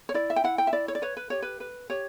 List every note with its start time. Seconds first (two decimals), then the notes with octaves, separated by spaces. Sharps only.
0.09 C#5
0.14 E4 D5
0.30 E5
0.36 G5
0.44 E4 F#5
0.58 G5
0.67 E5
0.73 E4 D5
0.88 C#5
0.95 D5
1.02 B4 C#5
1.17 B4
1.30 G4 C#5
1.42 B4
1.60 B4
1.90 G4 C#5